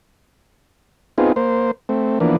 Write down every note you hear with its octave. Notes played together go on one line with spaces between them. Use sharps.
B3 C4 D#4 F4 G#4
A#3 C5
A3 C4
E3 F3 A#3 B3 D4